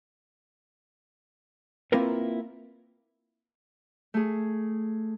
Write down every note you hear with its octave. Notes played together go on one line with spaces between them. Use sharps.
A#3 C4 E4 F4 A#4 B4
A3 G#4